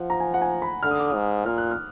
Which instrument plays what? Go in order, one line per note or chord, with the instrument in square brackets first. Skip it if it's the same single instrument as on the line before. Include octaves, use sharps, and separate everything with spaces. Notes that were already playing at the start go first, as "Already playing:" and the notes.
Already playing: [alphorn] F3 [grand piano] F#5
[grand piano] A#5
G#5
F#5
G#5
B5
[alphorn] D3 [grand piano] F6
[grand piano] D#6
D6
D#6
[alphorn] G#2
[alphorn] A#2 [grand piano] F6
[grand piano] F#6
F6